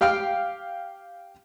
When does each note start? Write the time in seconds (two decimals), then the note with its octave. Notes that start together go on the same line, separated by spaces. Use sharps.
0.01 G4 F5 G5 F6